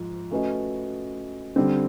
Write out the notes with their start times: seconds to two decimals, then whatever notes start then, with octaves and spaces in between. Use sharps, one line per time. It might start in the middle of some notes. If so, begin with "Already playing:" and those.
Already playing: G#2 F3
0.31 A3 C#4 F#4 B4 D#5
1.56 D3 G3 C4